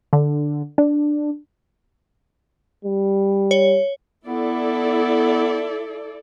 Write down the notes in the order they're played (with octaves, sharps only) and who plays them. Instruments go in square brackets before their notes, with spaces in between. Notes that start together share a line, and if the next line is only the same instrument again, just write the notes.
[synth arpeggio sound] D3
D4
[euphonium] G3
[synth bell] C#5
[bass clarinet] B3 [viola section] E4 A4 D5